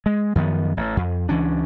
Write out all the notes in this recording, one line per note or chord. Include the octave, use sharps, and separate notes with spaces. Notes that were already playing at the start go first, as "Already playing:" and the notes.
G#3
F#2 D#3 F3 B3
A1
F2
C#2 E3 C#4 D4